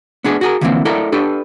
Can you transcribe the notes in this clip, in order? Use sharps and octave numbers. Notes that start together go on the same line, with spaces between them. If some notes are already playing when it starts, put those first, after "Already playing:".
B3 D4 G#4 B4
F#4 G#4 A#4
D3 E3 F3 A3 A#3 C4
E4 A4 A#4 D5 D#5
D4 G4 A4 B4